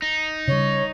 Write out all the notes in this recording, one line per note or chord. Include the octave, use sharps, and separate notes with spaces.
D#4
C#3 G3 C#5